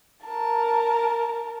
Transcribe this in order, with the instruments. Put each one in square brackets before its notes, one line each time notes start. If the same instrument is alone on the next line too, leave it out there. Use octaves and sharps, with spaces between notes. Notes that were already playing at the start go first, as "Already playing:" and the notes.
[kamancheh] A#4 A5